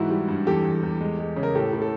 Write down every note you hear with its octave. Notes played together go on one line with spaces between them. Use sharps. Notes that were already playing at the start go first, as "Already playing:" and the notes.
Already playing: G#2 E3 E4 F#4
G3
G2
E2 G4 A4
E2
E2
G#3
G#3
C#3
A#4
A2 G4 A4
A2
A4